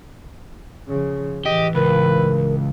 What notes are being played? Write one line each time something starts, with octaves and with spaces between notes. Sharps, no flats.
C#3 F3
A2 E3 G4 D#5
C#2 A#4 B4